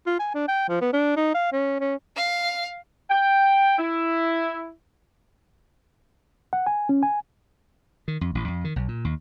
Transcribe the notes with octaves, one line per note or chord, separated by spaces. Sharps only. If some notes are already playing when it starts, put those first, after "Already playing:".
F4
G#5
D4
G5
F3
B3
D4
D#4
F5
C#4
C#4
F5
G5
E4
F#5
G#5
C#4
G#5
D#3
F2
A1
F2
D#3
B1
A#2
D#2